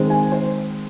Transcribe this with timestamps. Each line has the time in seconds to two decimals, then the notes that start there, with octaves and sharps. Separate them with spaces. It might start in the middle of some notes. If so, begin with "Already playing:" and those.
Already playing: D#3 G#3 C4
0.10 G#5
0.32 C5